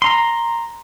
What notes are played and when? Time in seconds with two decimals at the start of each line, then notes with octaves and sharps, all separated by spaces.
0.02 A#5 C6